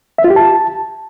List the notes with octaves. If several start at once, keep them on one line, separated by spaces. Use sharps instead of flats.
E5
F4
G4
A5